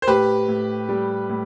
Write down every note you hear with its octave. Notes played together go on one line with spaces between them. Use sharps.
C5
A2 G4 B4
A2
G3
A2